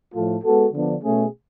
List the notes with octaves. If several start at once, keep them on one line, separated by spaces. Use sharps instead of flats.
A2 F3 A3 F4 A4
G#3 B3 F#4 A4
D3 F3 B3 D4
B2 A3 C#4 G#4